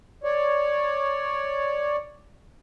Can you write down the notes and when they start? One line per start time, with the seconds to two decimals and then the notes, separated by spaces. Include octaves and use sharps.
0.24 C#5 D5